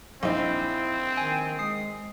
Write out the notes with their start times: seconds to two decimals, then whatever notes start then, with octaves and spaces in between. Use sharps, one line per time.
0.23 A#1 C4 D#4 E4
1.17 D#3 G5 G#5
1.59 G#3 D#6 C7